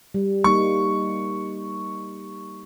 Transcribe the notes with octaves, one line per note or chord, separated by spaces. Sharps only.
G3
G3 A#3 D#4 C#6